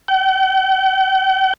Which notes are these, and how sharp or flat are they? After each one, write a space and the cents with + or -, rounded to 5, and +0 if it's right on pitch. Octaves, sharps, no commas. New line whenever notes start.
G5 -45